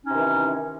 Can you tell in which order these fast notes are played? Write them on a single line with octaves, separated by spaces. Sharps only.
D#4 C#4 C3 D#3 E3